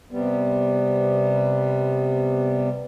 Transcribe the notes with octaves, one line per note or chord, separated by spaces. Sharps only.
C3 G3 B3